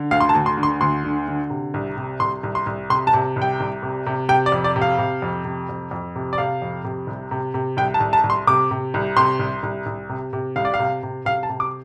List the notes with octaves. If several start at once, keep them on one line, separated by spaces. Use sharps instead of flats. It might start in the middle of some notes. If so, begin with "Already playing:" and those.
Already playing: D3
D2 F5
C6
A5
D2
C6
D3
C6
D2 C6
D3
D3
C3
C2
C3
C2 C6
C2
C6
C2
C3 C6
A5
C3
C2
G5
C2
C3
C3
C3 G5
D5
F2
D5
C3
F5
C3
F2
C3
F2
F2
C3
D5
C3 F5
F2
C3
C2
C3
C3
C2 G5
A5
C2
A5
C2
C6
C3 D6
C3
C2
C3 C6
C2
C2
C2
C3
C3
C2 F5
D5
F5
C3
C3
C3 F5
A5
C3
D6